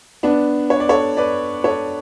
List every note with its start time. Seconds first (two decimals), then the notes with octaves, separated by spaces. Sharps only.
0.23 B3 D4
0.70 C#5
0.80 D5
0.89 A4 C#5
1.17 B4 D5
1.64 A4 C#5